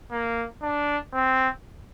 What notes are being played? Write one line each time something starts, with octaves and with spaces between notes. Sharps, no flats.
A#3
D4
C4